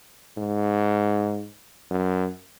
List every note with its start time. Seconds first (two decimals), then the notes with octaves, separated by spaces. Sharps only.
0.37 G#2
1.90 F#2